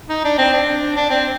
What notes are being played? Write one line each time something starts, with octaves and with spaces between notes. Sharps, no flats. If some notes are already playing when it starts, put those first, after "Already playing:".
D#4
D4
C4
D4
D4
C4